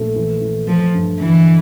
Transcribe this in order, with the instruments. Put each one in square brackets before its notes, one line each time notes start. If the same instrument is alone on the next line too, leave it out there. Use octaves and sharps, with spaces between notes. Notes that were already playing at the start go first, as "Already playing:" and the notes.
Already playing: [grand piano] A#1 A3
E3
E3
[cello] F3 [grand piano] A3
[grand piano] G2
[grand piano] D3 [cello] E3